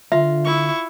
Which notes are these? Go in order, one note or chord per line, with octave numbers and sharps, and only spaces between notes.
D3 F4 E5
E4 C#6